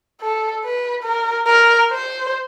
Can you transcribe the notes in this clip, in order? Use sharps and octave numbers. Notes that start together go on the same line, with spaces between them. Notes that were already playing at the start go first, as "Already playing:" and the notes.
A4
B4
A#4
A#4
C5